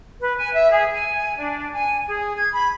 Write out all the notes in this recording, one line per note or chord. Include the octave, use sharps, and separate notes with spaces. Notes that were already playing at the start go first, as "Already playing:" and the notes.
B4
G#5
E5
G#4
G#5
D4
G#5
G#4
G#6
B5